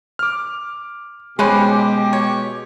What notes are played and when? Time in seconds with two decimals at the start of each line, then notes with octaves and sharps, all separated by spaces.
0.19 D6 F6
1.39 B2 G#3 C#4 G4 B4 C5
2.13 C#5